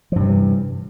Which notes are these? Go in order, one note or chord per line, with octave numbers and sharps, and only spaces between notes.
G2 C3 E3 F3